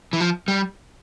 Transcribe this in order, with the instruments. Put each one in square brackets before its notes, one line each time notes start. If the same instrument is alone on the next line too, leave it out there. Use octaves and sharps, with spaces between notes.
[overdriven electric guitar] E3
F3
G3